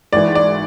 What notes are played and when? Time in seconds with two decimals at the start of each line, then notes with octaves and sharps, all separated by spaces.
0.13 G#1 G#2 E3 D5
0.35 D5